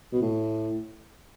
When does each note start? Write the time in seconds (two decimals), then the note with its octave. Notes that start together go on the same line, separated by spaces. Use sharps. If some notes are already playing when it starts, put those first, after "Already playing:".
0.12 B2
0.22 A2